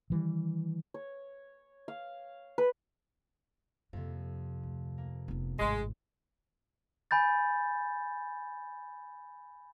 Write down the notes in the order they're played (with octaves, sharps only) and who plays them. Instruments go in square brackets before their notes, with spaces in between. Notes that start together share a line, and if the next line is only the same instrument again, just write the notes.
[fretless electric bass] D#3 E3 G3
[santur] C#5
F5
B4
[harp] F2 C3 [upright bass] A#3
[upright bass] D2
[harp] A#3
[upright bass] F1 B3
[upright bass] G#1 A2 [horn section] G#3
[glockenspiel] G#5 B5 G6 A6